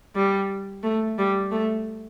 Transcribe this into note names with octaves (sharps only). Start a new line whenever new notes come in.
G3
A3
G3
A3